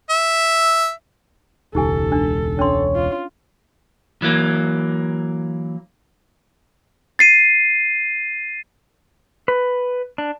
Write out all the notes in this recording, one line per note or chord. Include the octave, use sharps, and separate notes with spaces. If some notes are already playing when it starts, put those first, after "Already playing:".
E5
E1 C#2 D#4 G4 A4 G#5
D4
C#4 D4 C#5 C6
F4
E3 F#3 A#3
A6 C7 D#7
B4
D4